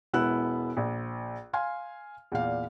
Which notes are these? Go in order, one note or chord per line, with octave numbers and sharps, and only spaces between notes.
E1 B3 E4 E6 F#6
A#1
F5 G#5 C6 F6
E2 A#2 F5